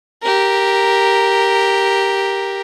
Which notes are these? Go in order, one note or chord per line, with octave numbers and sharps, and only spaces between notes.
G4 A#4